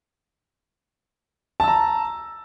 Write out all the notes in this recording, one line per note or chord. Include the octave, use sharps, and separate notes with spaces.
A5 A#5 E6